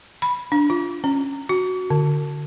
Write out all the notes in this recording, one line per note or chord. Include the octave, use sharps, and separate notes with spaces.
B5
D4
F4
C#4
F#4
D3